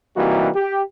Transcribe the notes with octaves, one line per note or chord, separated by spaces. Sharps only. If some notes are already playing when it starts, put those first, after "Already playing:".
C3 E3 G3 A#3 D#4 F#4
G4